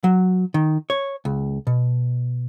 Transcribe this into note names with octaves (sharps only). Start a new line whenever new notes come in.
F#3
D#3
C#5
C#2
B2